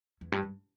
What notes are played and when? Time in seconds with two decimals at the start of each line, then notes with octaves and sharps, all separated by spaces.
0.21 E2
0.32 G2
0.43 G2